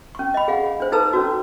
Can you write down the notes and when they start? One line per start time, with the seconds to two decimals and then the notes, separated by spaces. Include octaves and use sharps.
0.15 C#4 C#6
0.34 D#5 B5
0.48 G#4 F5 F#5
0.80 D4 C5
0.92 D#4 A4 B4 A5 A#5 E6
1.13 C#4 D4 F#4